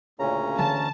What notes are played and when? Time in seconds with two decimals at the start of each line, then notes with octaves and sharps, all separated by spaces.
0.19 D2 A#2 C#3 C#4 A#5
0.58 D3 E3 A5